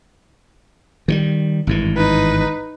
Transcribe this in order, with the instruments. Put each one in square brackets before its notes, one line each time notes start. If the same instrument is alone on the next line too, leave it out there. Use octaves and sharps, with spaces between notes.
[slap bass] D#3 E3 G3
G#1 G2 E3
[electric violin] D#4 B4